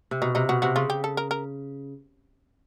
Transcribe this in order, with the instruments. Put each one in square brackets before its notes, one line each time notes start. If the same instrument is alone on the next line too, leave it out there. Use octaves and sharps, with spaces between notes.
[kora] C3
[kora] B2 [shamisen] D#4
[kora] C3 [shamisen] D#4
[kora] B2 [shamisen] F#4
[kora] C3 [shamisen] F#4
[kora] C#3 [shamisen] F4
[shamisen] G4
A4
A#4
A#4